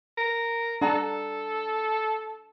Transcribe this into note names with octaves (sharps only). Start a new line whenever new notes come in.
A#4
D4 A4 F#5 A#5